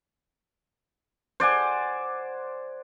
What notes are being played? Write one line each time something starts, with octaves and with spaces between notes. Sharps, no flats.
C5 D5 F#5 G#5